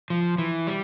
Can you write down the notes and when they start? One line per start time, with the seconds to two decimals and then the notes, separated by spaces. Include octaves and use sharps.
0.10 F3
0.38 E3
0.67 G3